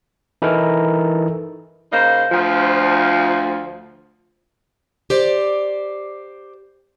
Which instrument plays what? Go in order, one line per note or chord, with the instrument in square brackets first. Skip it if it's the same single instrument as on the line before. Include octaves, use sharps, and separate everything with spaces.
[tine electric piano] E3 D#4 E4 A4 A#4
[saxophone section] C#3 A#3 D#4 C5
D2 F3
[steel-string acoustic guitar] G4 C5 D5